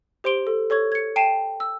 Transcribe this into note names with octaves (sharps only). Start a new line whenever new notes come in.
G4 C5 C6 D7 G7
A4
A4 C#5 C#6 G#6
G#6 C#7
G5 A5 C7 D#7 E7
E6